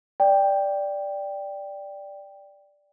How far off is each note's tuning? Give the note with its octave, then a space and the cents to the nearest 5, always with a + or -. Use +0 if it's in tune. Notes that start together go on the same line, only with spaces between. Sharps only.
D5 +0 G5 +5